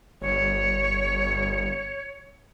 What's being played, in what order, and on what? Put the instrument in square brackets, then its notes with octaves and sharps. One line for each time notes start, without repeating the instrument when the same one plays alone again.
[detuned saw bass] G1 [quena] C#5